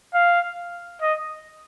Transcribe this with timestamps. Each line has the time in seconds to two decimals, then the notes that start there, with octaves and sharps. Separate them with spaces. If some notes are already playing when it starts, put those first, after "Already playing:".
0.14 F5
1.02 D#5